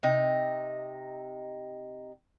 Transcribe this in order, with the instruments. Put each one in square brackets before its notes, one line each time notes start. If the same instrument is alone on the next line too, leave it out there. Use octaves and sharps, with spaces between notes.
[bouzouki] C3 D#4